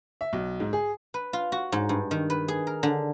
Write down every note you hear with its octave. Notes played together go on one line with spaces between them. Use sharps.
E5
B1
G#2
G#4
B4
F4
F#4
G#2
G2
D#3
B4
G#4
A#4
D3